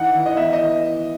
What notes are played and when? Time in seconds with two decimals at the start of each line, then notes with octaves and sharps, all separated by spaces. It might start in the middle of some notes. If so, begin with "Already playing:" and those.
Already playing: E3 D#4 F#5
0.15 E3
0.26 D#5
0.37 B3 E5
0.53 D#5
0.61 E3